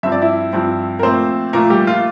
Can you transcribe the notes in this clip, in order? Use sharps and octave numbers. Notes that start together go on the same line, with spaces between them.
G2 F3 C4 E5
D5
E4 E5
G2 F3 C4
A#4
A#2 F3 A3 C4 C5
A#2 F3 A3 A#3 A#4
G3 G4
F4